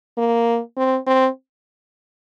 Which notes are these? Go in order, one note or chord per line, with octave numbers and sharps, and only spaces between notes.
A#3
C4
C4